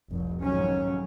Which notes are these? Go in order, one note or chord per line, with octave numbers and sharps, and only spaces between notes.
F1 C2
F2 G#2 D#3 F#3 C#4